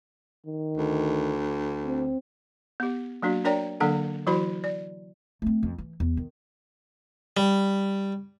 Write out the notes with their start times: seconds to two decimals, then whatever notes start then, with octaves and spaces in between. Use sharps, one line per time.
0.46 D#3
0.77 D2
1.85 C4
2.80 B3 G4
3.22 F#3 A#3 D4 F#4
3.45 D4 A#4 C#5 D5 G5 A#5
3.80 D3 F#3 A#3 D4 A4 F#5
4.27 E3 F#3 E4 F#4 C5 B5
4.64 D5
5.42 A3 C4
5.63 F2
5.78 E3
6.00 E2
6.17 D#3
7.37 G3